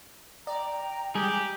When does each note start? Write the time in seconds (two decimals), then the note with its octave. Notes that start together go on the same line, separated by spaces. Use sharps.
0.47 D5 G5 A#5
1.15 G3 G#3 G4 G#4